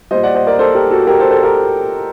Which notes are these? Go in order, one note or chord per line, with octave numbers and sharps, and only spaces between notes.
A#2 G3 C5 D#5
D5 F#5
C5 D#5
A#4 D5
A4 C5
G4 A#4
F#4 A4
G4 A#4
A4 C5
A4 C5
G4 A#4